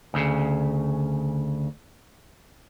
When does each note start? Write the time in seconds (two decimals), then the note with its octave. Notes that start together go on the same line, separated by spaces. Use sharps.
0.14 D2 C#3